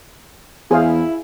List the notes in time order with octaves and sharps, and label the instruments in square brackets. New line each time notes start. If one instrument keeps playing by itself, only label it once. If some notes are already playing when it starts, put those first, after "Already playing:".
[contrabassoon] E2 [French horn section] E4 [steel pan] G#4 C5 F5